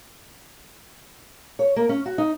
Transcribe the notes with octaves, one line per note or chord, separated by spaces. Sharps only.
C#5
A#3
C#4
F#4
D#4